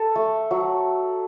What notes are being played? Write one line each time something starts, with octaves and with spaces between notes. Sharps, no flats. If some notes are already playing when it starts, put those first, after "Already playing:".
Already playing: A4
A3
F#3